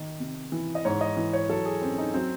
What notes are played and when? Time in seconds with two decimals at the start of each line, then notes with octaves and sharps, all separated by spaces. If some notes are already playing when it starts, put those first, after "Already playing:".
Already playing: D#3
0.20 C3
0.52 E3
0.75 D#5
0.85 G#2 C#5
1.01 D#5
1.17 E3
1.33 C#5
1.49 F#3 A4
1.65 G#4
1.82 C4 C#4
1.98 D#4
2.14 F#3 C4